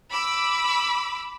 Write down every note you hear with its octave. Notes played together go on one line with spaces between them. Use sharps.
B5 D6 E6